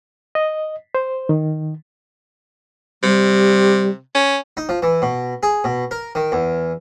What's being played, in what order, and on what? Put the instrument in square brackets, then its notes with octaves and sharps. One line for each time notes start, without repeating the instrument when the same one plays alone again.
[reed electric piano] D#5
C5
D#3
[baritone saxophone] C3 [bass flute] G3
[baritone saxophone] C#4
[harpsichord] D#4
F3
E3
B2
G#4
B2
A#4
D#3
E2